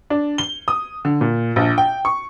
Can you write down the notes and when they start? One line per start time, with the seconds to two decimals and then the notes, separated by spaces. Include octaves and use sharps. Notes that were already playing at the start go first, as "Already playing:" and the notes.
0.10 D4
0.38 G7
0.68 D#6
1.05 D3
1.21 A#2
1.56 A#1
1.78 G5
2.05 C#6